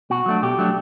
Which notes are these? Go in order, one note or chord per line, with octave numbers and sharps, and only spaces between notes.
B2 F#4
F#3 A3 D4
B2 G4
F#3 A3 D4